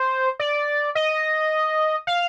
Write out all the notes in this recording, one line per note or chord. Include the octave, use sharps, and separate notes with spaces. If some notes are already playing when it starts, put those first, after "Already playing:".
Already playing: C5
D5
D#5
F5